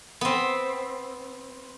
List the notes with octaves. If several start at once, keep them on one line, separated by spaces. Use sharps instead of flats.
B3 C4